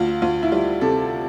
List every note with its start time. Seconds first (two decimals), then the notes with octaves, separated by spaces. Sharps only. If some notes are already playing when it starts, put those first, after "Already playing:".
Already playing: D2 F4
0.22 D2 F4
0.43 E4
0.52 G3 F4
0.81 C3 A4